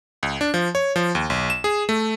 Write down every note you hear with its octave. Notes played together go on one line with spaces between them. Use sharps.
C#2
D4
F3
C#5
F3
D#2
B1
E7
G#4
A3